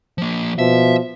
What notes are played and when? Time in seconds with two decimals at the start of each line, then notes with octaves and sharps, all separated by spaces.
0.18 F3 A#3
0.59 B2 F3 E5